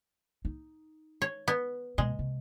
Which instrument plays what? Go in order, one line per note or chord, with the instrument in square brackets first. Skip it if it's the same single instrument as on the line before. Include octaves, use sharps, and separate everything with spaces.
[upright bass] D#4
[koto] C#5
B3
[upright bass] B2 [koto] G#3
[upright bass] C3